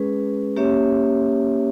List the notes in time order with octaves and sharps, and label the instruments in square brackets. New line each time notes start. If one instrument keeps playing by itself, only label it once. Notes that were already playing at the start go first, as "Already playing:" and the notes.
Already playing: [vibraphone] G#3 C#4 G#4 B4
A#3 C#4 G4 C#5 E5